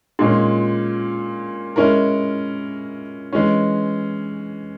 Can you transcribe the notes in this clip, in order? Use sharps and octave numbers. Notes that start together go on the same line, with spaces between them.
A#2 G#3 C#4
G#3 C#4 E4 A#4
E3 G#3 C#4